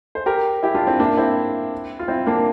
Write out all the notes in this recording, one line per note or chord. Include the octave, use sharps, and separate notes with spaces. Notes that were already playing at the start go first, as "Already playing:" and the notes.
C5
G4 A#4
E4 G4
D4 F4
C4 E4
A#3 D4
C4 E4
F4
C4 E4
A#3 D4